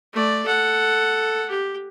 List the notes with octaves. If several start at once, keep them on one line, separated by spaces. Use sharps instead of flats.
A3 D5
A4 F#5
G4